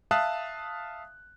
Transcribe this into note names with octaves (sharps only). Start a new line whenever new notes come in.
E5 F5 A5 D#6 F#6